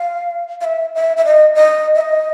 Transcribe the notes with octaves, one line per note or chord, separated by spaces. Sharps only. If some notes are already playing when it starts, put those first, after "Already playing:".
Already playing: F5
F5
E5
E5
E5
D#5
D#5
E5
D#5